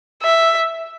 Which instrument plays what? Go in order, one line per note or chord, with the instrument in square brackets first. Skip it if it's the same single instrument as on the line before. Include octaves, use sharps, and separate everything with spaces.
[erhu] E5